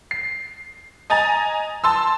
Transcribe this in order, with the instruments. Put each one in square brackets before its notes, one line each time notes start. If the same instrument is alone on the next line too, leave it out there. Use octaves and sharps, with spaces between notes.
[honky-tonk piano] C7
D#5 G#5 A#5 A6
A5 C6 E6